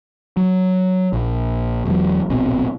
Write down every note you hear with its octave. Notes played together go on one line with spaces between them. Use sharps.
F#3
A#1
E1 E2 F#3
D1 A#1 B2 C4